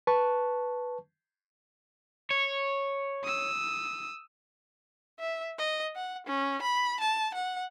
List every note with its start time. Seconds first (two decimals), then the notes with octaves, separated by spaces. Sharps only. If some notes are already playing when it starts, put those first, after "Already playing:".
0.07 B4 A5 C#6
2.31 C#5
3.24 D#6 E6
5.20 E5
5.59 D#5
5.96 F#5
6.27 C#4
6.62 B5
7.00 A5
7.34 F#5